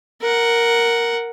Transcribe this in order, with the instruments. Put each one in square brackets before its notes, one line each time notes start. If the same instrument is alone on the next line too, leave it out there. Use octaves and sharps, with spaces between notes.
[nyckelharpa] A#4 F#5